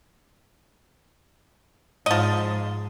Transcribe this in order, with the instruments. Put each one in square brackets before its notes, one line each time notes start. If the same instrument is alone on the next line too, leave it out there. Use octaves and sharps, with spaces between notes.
[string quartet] G#2 [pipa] F3 D#5